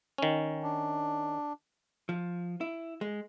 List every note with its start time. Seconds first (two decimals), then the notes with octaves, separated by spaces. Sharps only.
0.18 D#3 C#4
0.63 D4
2.09 F3
2.61 E4
3.01 G#3